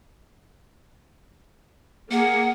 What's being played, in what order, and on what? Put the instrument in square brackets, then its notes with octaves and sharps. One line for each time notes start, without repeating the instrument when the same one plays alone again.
[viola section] A#3 G#4 [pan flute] F#5